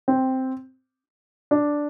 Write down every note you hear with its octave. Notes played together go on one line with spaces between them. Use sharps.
C4
D4